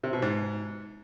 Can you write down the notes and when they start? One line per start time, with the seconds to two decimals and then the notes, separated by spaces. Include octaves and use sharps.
0.03 C3
0.13 B2
0.22 G#2